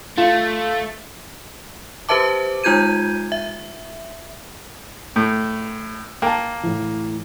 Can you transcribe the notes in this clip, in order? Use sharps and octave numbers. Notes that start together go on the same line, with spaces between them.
A3 F4
G4 B4 C5 E5 A5 D6
G#3 D#4 F4 G6 G#6 D#7
E5
A2
A#3 G5 A5
A2 E3